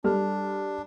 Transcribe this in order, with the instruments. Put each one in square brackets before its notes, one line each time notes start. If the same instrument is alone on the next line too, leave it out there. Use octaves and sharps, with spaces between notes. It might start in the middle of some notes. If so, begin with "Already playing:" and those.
[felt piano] G3 A4 F6 [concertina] D4